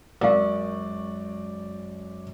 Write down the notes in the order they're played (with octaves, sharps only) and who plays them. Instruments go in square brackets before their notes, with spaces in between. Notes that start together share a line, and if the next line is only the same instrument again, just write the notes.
[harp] F#2 G#3 C#6 [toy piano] A#4 F5 [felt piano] D5